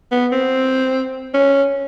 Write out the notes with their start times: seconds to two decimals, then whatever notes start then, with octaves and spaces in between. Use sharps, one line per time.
0.12 B3
0.32 C4
1.34 C#4